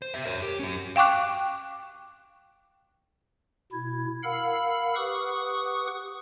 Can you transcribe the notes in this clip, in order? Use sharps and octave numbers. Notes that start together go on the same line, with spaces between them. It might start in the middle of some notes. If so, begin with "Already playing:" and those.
C5
C5 E5
A#4 C#5
G4
C#4 F#4
F5 G5 C#6 D6 F#6
B2 E4 G#6
A#4 F5 F#5 B5 E6
G4 B4 F#5 C#6 D#6